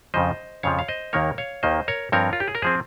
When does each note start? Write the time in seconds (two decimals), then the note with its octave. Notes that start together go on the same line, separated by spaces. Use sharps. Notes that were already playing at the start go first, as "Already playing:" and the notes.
0.14 F2 C#3 F3 C5 D#5
0.63 F2 C#3 F3 C#5 F5
0.79 F5
0.88 C5 D#5
1.13 D#2 D#3 A#3 A#4 C#5
1.38 C#5 F5
1.63 D#2 D#3 A#3 C5 D#5
1.88 A#4 C#5
2.12 G2 F3 C4 A#4 C#5
2.33 F4
2.40 G4
2.48 G#4
2.55 A#4
2.62 F3 C4 G#4 C5